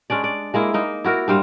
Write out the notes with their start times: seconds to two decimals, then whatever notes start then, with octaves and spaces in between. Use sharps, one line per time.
0.10 G#3 C#4 D4 D5
0.24 D5
0.54 G#3 A#3 E4
0.74 A#3 D#4
1.04 E4 F#4 A#4
1.28 G2 G3 C5 F5